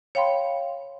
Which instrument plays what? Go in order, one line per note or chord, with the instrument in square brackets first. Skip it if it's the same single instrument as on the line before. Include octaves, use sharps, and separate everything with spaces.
[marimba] C#5 F5 G5 B5 C6